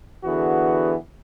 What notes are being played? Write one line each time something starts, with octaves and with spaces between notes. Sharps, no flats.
D3 E3 B3 F#4 G#4